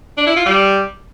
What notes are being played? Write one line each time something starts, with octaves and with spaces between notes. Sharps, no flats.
D4
E4
F4
G3